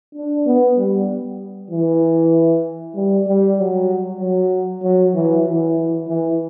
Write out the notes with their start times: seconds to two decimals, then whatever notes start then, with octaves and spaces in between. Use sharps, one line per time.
0.15 D4
0.46 B3
0.78 G3
1.71 E3
2.96 G3
3.27 G3
3.58 F#3
4.21 F#3
4.83 F#3
5.14 E3
5.46 E3
6.08 E3